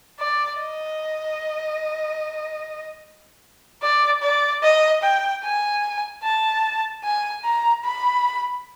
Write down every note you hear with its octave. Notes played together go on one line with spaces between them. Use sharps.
D5
D#5
D5
D5
D#5
G5
G#5
A5
G#5
A#5
B5